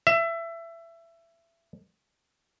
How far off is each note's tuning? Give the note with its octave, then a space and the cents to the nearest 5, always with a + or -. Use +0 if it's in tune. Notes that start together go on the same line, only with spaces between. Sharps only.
E5 +20